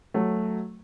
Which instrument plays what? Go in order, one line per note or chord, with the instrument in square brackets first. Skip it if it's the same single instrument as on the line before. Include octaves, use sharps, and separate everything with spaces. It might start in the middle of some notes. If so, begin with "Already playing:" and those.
[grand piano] F#3 A3